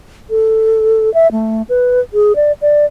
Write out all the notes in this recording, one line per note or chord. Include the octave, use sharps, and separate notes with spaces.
A4
E5
A3
B4
G#4
D5
D5